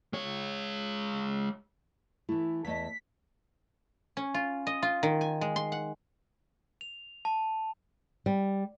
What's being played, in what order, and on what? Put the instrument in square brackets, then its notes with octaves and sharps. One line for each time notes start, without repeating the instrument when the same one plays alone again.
[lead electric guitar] G#3 C#5
[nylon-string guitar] E3 A3 [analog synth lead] E4
[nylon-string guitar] E2 A3 D#5 [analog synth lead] B6
[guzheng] C#4
F4
D#5
F4
D#3
G#5
G#3
C6
F#5
[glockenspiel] F7
A5
[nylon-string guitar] G3